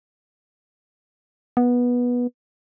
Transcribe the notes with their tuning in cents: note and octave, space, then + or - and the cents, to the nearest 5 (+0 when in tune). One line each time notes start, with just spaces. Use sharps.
B3 -15